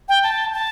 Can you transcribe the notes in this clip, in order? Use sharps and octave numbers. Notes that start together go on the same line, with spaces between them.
G5
A5
A5